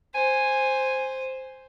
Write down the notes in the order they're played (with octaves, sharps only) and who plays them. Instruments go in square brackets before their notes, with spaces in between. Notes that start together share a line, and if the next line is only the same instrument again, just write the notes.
[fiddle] C5 [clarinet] G#5